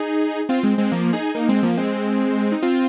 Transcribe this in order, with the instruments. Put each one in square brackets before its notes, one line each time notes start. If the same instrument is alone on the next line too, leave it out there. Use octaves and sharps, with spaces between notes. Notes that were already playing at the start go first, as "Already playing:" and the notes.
Already playing: [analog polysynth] D#4 G#4
C4 F4
G#3 C4
G#3 C4
F3 A#3
D#4 G#4
A#3 D#4
G#3 C4
F3 A#3
G#3 C4
D#4
C4 F4